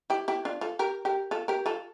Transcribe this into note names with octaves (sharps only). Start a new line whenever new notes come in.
E4 G4
E4 G4
D4 F4
F4 A4
G4 A#4
G4 A#4
F4 A4
G4 A#4
F4 A4